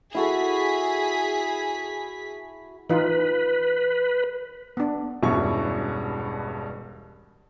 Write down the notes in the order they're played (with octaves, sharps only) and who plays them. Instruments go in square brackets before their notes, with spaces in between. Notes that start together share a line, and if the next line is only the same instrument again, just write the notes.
[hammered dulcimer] E4 F#4 A4 [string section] G#4 B6
[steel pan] E3 D#4 F4 [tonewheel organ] B4
[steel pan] B3 D4
[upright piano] E1 G2 B2 C#4 E4 C#6